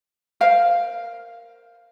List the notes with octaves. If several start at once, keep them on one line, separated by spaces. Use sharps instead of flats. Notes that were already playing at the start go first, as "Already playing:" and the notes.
A#4 C5 F5